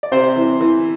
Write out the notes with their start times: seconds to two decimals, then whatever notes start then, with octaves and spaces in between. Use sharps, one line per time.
0.03 D5
0.12 C3 C4 C5
0.36 E3
0.60 E3